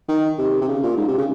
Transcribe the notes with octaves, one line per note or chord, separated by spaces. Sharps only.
D#3
C3
C3
C#3
A#2
G#2
C3
C#3